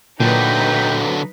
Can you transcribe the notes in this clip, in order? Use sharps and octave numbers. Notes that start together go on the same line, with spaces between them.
A#2 D3 F#3 D#4 B4 G5